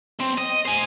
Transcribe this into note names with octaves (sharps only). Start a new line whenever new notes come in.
B1 C4
D#5
C5 G#5